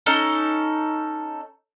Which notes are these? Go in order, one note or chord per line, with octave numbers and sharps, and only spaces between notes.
C#4 D#4 A4